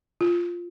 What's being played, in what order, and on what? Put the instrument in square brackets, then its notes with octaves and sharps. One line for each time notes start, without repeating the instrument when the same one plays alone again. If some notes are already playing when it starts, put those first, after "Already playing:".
[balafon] F4